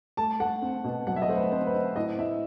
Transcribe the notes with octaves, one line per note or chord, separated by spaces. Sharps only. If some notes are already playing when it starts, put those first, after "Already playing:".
A3 A5
A3 F#5
C4
B2
F#3 F#5
E5
D#5
A3 C5
B4
C4 C5
B4
C4
A2 D#5
A2 E5